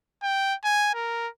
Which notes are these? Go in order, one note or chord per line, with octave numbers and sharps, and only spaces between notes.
G5
G#5
A#4